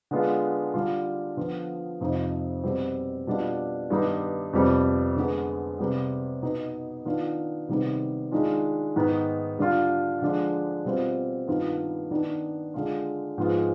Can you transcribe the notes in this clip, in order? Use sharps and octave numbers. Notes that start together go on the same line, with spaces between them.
D3 G#3 B3 D4 F4
D3 G3 D4 F4
D3 F3 B3 F4
F2 C3 F3 C4 D#4
B2 G3 C4
B2 G3 D4 F4
G2 D#3 G3 B3 D#4
F2 C3 G3 B3
D3 G#3 B3
C3 G3 B3
B2 B3 D#4
D#3 B3 D4 F4
C3 D#3 G3 B3
D#3 G#3 D4 F4
G#2 D#3 B3 D#4
D3 G3 D4 F4
D3 F3 G#3 D4
B2 G3 C4 F4
G2 D#3 B3 F4
D#3 B3 D4
D3 G#3 D4 F4
G#2 F3 G#3 B3 F4